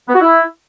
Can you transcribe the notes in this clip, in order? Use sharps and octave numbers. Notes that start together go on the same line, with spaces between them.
B3
F#4
E4